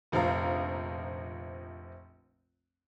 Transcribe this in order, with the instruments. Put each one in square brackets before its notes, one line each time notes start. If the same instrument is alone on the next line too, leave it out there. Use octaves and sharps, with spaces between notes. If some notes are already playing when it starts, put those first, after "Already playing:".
[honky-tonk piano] F1 A#1 F3 F5 A#5